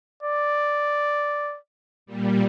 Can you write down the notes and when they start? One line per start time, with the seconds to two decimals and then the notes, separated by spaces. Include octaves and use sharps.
0.23 D5
2.06 A#2 G3